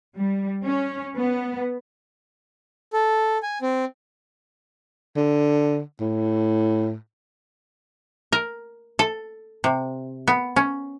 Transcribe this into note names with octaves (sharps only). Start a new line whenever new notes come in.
G3
C#4
B3
A4
G#5
C4
D3
A2
A#4
A4
C3
B3
C#4